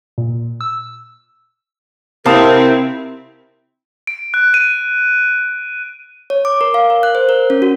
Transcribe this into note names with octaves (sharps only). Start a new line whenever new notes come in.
A#2
E6
C3 C4 E4 A#4 F5 A5 D#6
D7
F#6
D#7
C#5
D6
A#4
F5
A#4
F#6
C5
A#4
C#4
F#4